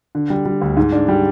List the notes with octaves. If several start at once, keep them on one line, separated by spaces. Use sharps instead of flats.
D3
G3
G3
D2
G#2
D4
G3